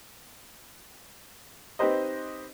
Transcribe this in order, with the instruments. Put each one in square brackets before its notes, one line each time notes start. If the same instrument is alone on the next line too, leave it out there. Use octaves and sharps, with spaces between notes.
[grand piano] C4 D#4 G4 B4 C5 D#5